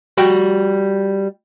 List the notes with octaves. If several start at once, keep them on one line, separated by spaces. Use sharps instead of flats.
G3 F#4 G5